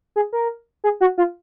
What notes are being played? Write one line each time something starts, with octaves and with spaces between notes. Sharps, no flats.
G#4
A#4
G#4
F#4
F4